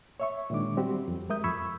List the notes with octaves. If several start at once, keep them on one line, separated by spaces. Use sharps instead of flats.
C#5 E5 C#6
A#2 D#3 G#3 D4 D6
G3 C4 F#4 G4
F2
G#3 A#4 E5 D#6 G6
F2 B5 C#6 E6 G#6